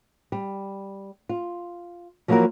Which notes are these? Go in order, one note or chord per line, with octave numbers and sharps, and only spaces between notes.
G3
F4
F3 F#3 A#3 E4 F#4 A#4